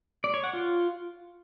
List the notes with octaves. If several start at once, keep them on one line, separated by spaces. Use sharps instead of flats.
D5
C#5
F#5
F4